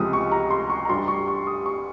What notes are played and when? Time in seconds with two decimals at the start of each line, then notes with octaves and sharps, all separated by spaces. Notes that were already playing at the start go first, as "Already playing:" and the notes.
Already playing: C#2 C3 F3 G#3 D#6
0.13 C#6
0.32 A#5
0.51 C6
0.70 C#6
0.85 A#5
0.89 G2 G3 C6
1.08 C#6
1.28 C#6
1.47 D#6
1.66 C#6